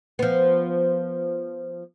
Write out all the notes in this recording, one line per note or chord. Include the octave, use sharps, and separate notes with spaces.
F3 B3